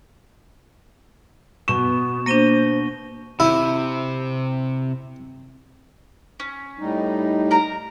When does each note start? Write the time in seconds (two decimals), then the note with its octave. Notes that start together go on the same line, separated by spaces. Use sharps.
1.68 B2 B3 C#6 E7
2.26 A#3 D4 C5 A#6 D#7 G7
3.40 C3 E4
6.40 C#4
6.79 A2 G3 D#4
7.51 A#4 A#5